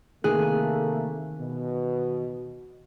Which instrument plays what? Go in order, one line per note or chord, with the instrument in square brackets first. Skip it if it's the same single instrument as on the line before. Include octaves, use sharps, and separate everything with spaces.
[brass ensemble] C3 A3 A#3 [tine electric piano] D#3 F#6 [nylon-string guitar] G#4
[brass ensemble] B2